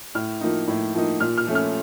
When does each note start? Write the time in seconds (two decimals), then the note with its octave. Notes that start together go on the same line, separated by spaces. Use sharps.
0.15 A2 F6
0.41 F3 A#3 D#4
0.68 A2
0.94 F3 A#3 D#4
1.20 A#2 F6
1.38 F6
1.46 F3 A3 C#4
1.55 F6